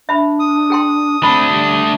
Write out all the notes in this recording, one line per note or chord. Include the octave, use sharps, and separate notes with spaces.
D4 E5 B5
D#6
G#4 G5 C6
A3 C4 D4 B5
G3